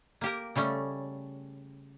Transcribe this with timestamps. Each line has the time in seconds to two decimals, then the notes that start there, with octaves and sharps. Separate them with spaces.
0.21 A#3 G4 A#4
0.55 C#3 G3 A3 C#4